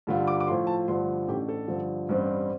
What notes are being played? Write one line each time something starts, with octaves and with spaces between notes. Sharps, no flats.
G2 D3 G3 F4
D6
D6
A2 F3 A3 F4 C6
A5
G2 D3 F3 A3 C6
A1 A2 A3 D4 G4
A4
G2 D3 F3
A1 G2 G3 C4